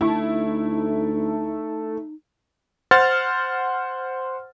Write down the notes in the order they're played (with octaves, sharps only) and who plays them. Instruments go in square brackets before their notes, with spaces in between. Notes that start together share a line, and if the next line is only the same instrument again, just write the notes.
[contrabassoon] D2 [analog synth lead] A3 [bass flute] D#4 [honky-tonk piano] E4
[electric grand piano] C5 F#5 C6 F6 A6